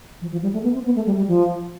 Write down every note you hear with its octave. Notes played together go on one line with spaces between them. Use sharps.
F3
F3
G3
A3
B3
C4
B3
A3
G3
G3
F3